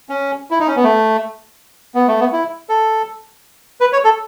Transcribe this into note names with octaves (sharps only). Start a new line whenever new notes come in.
C#4
E4
D#4
C#4
B3
A3
B3
A3
B3
E4
A4
B4
C#5
A4